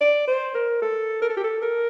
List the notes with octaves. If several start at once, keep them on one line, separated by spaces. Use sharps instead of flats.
D5
C5
A#4
A4
A#4
A4
G4
A4
A#4